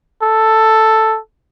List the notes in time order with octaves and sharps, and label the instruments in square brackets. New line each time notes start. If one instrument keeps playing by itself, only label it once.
[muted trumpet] A4